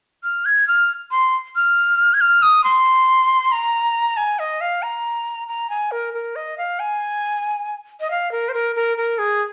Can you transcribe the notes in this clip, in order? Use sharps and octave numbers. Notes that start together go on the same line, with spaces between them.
F6
G#6
F6
C6
F6
G#6
F6
D#6
C6
A#5
G#5
D#5
F5
A#5
A#5
G#5
A#4
A#4
D#5
F5
G#5
D#5
F5
A#4
C5
A#4
A#4
A#4
G#4